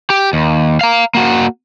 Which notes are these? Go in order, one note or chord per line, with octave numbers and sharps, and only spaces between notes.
G4
D#2
F5 A#5
A#3 F#4